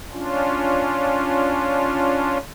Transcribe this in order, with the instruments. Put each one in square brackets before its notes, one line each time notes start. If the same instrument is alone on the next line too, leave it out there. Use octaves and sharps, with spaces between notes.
[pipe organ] C#4 D4 F4